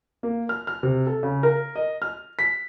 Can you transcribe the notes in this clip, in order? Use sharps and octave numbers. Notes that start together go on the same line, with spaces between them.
A#3
F6
F6
C3
A4
C#3
A#4
D#5
F6
B6